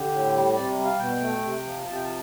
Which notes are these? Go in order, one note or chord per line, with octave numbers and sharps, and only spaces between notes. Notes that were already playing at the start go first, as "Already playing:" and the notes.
Already playing: D3 G4
A2
G3
C3 D5
G3
F5
B2 G5
A3
C3
F3
C3 A5
G5
A5